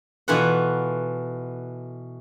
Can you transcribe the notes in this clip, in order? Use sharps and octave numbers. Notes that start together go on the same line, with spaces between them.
B2 E3 F4 A4 B4 F#5